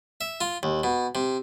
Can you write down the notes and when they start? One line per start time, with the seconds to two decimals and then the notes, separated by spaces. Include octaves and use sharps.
0.21 E5
0.41 F4
0.63 D#2
0.84 B2
1.15 C3